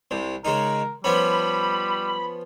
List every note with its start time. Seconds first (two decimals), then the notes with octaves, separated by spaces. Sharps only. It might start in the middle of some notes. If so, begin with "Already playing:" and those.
0.11 C2 C3
0.45 C#3 G#3 D#4 A#4
1.04 F3 G3 B3 C#4 B5